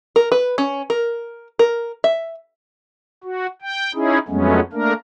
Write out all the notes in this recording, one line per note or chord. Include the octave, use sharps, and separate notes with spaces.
A#4
B4
C#4
A#4
A#4
E5
F#4
G5
C#4 D#4 E4 G#4
F2 F#3 G#3 A3 B3 C#4
A3 A#3 D4 A#4